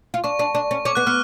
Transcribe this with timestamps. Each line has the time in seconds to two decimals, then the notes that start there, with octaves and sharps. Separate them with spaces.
0.14 F4
0.24 D4 C#6
0.39 D4
0.55 D4
0.71 C#4
0.85 C#4 D6
0.95 B3 F#6
1.07 B3 F6